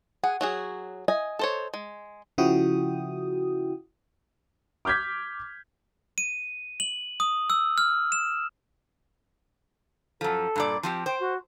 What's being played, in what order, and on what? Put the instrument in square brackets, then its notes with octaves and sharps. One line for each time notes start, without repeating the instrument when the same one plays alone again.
[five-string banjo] G#4 [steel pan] F#5
[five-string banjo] F#3 F#4 G#4
[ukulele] D#5 [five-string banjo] G#5
[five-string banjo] A4 C5 C#5
G#3
[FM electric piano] C#3 F3 E4 F#4 G5 D#6
[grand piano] D6 F6 G6 G#6 B6
[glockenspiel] D#7
F#7
D#6
E6
F6
E7
[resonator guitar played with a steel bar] F#2 F3 [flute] A4
[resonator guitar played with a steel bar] G2 A#2 D5
F3 C4 G4
[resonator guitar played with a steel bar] C5 [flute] G5
[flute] F#4